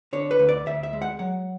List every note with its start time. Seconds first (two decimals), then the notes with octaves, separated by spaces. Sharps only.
0.13 D3 C#5
0.31 B4
0.39 D2
0.49 D5
0.66 D2 E5
0.83 E5
0.93 G#3
1.02 F#5
1.19 F#3 F#5